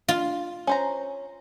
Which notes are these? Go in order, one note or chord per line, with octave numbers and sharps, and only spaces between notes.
F4
C#4 C5 A#5